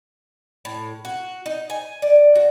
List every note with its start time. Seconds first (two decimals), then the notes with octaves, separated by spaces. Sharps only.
0.65 A2
1.05 F#4
1.46 D#4
1.70 G#5
2.02 D5
2.35 F#4